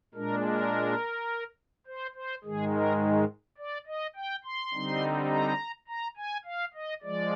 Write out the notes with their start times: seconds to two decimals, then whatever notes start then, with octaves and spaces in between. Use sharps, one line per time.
0.14 A#2 G#3 D4 A#4
0.43 A#4
1.87 C5
2.15 C5
2.44 G#2 D#3 G#3 G#4
2.73 A#4
3.58 D5
3.87 D#5
4.16 G5
4.45 C6
4.74 D3 G3 C4 D#4
5.31 A#5
5.88 A#5
6.17 G#5
6.45 F5
6.74 D#5
7.02 F3 G#3 D5